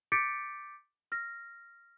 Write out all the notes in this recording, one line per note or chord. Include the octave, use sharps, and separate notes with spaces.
D6 G6 A6 B6 C#7 D7
F6 A#6